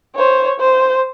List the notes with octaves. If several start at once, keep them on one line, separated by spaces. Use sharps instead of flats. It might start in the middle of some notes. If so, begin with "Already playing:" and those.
C5 C#5
C5